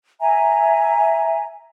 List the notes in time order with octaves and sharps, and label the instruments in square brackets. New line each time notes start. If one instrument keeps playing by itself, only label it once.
[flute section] E5 G#5 A#5